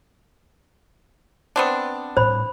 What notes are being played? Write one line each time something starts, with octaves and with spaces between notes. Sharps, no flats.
B3 C4 D4
A2 G3 C5 B5